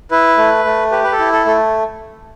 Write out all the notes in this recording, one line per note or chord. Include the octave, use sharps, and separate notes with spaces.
E4 B4
A3
A3
G4 B4
B4
A4
E4
A4
A3 A4